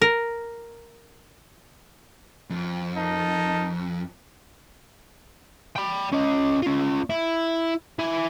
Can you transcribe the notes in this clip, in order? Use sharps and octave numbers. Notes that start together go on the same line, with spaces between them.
A#4
F2
D#4 A#4 A5
G5 B5
C#4 D#5
C#4 F4
E4
E4 G#5